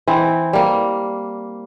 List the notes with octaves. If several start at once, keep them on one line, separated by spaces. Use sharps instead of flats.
E3 C4
G3 A#3